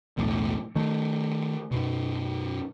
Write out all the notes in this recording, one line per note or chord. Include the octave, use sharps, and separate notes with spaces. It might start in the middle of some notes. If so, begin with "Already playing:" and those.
B1 E2 A2
D#3 A3
F#2 B2